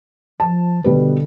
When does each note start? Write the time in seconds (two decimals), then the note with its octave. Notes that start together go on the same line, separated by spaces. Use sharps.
0.40 F3 A5
0.84 B2 D3 G3 B4